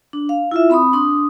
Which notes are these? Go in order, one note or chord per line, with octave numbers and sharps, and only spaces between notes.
D4
F5
E4 F4 E5
C4 B5 C6 D#6
D4 C6 D#6